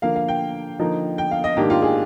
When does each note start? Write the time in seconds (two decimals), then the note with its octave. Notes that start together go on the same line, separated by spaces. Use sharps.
0.02 D3 F3 A#3 F5
0.16 F5
0.28 G5
0.79 D3 F3 A#3 D#4
1.18 G5
1.31 F5
1.44 D#5
1.57 G#2 D#3 A#3 D4 G4
1.70 F4
1.82 G#4